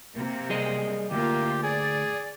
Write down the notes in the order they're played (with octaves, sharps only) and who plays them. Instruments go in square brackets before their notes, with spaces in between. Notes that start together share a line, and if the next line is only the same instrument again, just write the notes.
[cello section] C3 A#3
[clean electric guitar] G3 G#4 D#5
[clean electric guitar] D2 [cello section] A#3 F4 [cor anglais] G4
[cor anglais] G#4 [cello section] D5